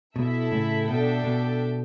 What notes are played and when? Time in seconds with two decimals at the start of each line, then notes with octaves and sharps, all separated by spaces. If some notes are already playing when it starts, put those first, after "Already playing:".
0.16 B2 E4 A4 E5
0.52 A2 C#3
0.88 B2 D4 A4 E5 G5
1.24 B2